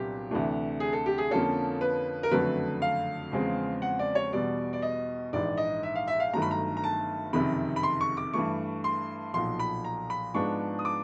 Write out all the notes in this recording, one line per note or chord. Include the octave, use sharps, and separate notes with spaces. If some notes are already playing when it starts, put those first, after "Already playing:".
Already playing: C2 A#2 F#3 B3 D4 G4
D2 C3 E3 A3 D4
G#4
A4
G4
G#4
F2 D3 F3 A#3 C#4 A4
B4
A#4
F#1 F2 D3 F#3 A3 B4
F5
E2 C#3 F3 G#3 C4
F#5
D5
C#5
E2 B2 G3 D5
D5
D#5
A#1 G#2 E3 D5
D#5
E5
F5
E5
F5
G1 G2 D#3 F#3 A3 A#5
B5
A#5
A#5
A5
F#1 F2 C3 D#3 B5
B5
C6
C#6
D6
G2 E3 A3 C#6
C6
B1 A#2 F3 C6
B5
A#5
B5
G#2 F3 G#3 B3 D4 C#6
D#6
D6